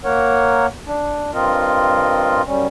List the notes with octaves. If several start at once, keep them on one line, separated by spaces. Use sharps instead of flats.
A#3 A#4 C#5 F#5
D4
G2 C4 F4 A#4 D#5
F#2 G3 C#4